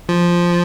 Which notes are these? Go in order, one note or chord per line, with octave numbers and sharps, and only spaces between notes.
F3